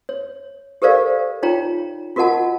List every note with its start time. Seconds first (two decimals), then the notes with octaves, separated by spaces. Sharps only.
0.09 C#5
0.82 G4 A4 A#4 C5 D5 F5
1.43 D#4 F4 C#5 G5 A#5
2.16 F4 F#4 A#4 D#5 F#5 A5